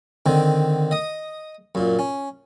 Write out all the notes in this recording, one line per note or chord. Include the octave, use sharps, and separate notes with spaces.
D3 D#3 C4
D#5 D#6
F#2 A#2
C#4